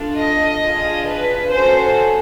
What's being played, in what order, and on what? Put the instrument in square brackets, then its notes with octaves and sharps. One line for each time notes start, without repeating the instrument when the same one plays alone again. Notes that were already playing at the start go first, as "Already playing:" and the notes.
Already playing: [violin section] D4 F4 A4
D#5
D4 F4 G#4
B4
C#4 F#4 A4 C5